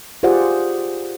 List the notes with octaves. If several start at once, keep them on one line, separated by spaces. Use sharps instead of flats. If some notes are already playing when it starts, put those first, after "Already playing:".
F4 G4 G#4 C5 D5 F#5